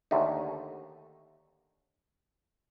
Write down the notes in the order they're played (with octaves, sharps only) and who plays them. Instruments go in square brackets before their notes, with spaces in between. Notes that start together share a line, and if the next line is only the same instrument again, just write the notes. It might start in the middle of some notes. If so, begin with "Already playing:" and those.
[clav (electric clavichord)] D#2 D3 A3 D#4